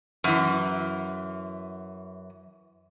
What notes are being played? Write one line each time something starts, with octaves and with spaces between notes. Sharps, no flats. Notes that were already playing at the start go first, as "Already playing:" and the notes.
F#2 E3